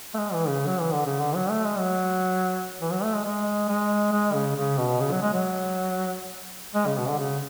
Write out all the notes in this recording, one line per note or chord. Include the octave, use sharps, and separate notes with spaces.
A3
G#3
E3
C#3
F#3
E3
D3
C#3
D3
F#3
A3
G#3
F#3
E3
F#3
A3
G#3
G#3
G#3
G#3
C#3
C#3
B2
C#3
F#3
G#3
F#3
G#3
C#3
B2
D3
C#3